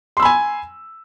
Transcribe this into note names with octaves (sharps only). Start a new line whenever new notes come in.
G#5 B5 C6 E6